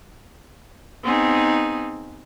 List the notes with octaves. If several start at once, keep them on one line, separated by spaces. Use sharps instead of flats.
B3 C4 D#4 G#4